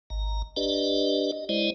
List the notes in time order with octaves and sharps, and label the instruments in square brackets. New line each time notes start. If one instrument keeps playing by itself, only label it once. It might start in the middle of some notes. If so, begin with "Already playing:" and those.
[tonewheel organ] G#1 A#5
D4 G4 B4 D5 D#5
D#5
G#3 E4 C5 D5 D#5